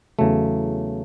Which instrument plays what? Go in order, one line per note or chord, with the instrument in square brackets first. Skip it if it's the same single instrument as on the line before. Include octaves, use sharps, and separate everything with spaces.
[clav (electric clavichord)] E2 C#3 F#3 A3